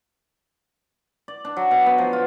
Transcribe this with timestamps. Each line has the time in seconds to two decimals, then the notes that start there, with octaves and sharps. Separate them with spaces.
1.28 D5
1.45 D4
1.57 F#3
1.71 B2
1.86 B3
1.98 F3
2.13 F4